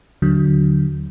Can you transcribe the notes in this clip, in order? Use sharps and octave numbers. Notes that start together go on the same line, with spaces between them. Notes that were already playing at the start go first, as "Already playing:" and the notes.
D#2 D3 F#3